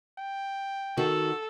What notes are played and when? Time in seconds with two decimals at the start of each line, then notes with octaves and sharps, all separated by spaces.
0.19 G5
0.97 D#3 F#4 A4